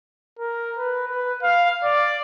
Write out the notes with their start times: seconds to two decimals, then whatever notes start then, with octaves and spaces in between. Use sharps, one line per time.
0.39 A#4
0.78 B4
1.08 B4
1.43 F5
1.84 D5